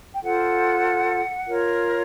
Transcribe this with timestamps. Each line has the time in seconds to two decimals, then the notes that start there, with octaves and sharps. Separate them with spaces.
0.13 G5
0.21 F4 A4 C5 F#5
1.46 F4 A#4 C#5